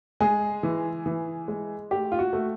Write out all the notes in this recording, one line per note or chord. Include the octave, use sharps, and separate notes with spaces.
G#3 G#4
E3
E3
G#3
A3 G4
F4
F#4
A3